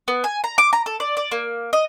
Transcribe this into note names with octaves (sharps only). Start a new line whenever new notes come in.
B3
G#5
A#5
D6
A#5
A4
D5
D5
A#3
D#5